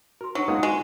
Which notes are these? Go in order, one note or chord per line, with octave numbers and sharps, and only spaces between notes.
F#4 A#4 C6
F#3 D4 D#4 F#5
G#3 A#3 B3 C#4 D#4 F4 F#5 D#6
G#3 F#4